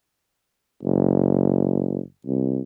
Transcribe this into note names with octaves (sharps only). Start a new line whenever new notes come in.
F#1
C2